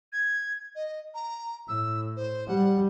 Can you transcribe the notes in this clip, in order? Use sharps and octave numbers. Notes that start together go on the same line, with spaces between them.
G#6
D#5
A#5
A2 E6
C5
G3 F#5